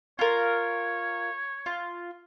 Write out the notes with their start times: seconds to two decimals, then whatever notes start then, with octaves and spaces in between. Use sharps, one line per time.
0.19 F4 A#4 C#5
1.66 F4